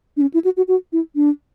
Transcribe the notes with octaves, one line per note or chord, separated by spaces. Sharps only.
D4
C#4
E4
F#4
F#4
F#4
E4
D4